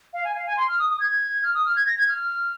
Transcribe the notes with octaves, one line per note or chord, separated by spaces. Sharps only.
F5
G#5
F5
G#5
C6
F6
D#6
D#6
G#6
F6
D#6
F6
G#6
A#6
G#6
F6